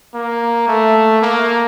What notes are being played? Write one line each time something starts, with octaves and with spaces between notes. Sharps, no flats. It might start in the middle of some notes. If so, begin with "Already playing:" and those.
A#3
A3
A#3